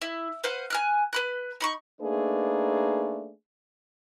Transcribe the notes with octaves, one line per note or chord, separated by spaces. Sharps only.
E4
B4 C5 F5 F#5
G#5 F6 F#6
B4 B5 F#6
D#4 B5 C#6
A3 A#3 D4 D#4 G#4 B4